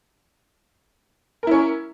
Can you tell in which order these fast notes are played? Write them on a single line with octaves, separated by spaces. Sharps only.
A#4 E4 C#4